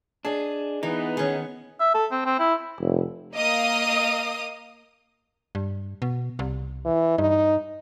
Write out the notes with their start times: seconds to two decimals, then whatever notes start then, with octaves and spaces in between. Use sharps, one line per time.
0.25 D4 G#4 D#5
0.83 E3 B3 D#4
1.17 D#3 C#4 G#4 C#6
1.80 E5
1.94 A4
2.11 C4
2.26 C4
2.39 E4
2.80 F1
3.34 A#3 D#5 F5 D#6
5.55 G2
6.02 B2
6.39 C2
6.85 E3
7.18 G2 D#4